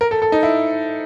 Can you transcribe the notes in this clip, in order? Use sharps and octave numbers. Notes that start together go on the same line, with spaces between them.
A#4
A4
A4
D#4
E4